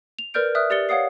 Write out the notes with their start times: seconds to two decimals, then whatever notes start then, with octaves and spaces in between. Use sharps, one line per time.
0.19 F7
0.34 A#4 B4 D5 F6 G6 D7
0.55 D5 E5 D#6 F6 F#6
0.70 G4 D5 A6 C#7 G7
0.89 C#5 F5 F#5 D#6 C7